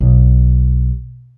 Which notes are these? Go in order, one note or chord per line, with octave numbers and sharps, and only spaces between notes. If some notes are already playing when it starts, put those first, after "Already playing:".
B1